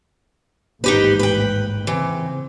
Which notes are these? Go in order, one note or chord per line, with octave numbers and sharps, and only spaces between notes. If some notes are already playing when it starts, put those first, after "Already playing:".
A1 D#2 G#2 D#4 G4 B4
B4 G5
C#3 E3 C4